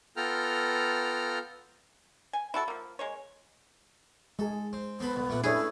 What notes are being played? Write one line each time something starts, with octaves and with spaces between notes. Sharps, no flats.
B3 F4 A4 G5 A#5 F6
G#5
E4 F#4 A4
F3 A#3
G#3 A#3 C#5
G#3 G#4 A4
C4
B3 C4 A4 B5
C2
A#2 A3 F#5
A3 C#4 D4 E4 G#4 B4 C#5